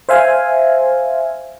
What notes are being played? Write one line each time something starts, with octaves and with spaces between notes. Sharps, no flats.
C5 E5 F5 G#5